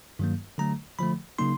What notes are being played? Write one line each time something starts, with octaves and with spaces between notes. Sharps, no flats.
G2 D#3 F#3 A#3
D3 F#3 A3 A#5
D3 F3 A3 B5
C#3 F#3 A#3 D#4 C6